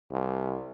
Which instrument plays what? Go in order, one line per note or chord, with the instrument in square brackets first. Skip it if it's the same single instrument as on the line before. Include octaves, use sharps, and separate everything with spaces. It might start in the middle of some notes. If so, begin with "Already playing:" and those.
[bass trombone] C2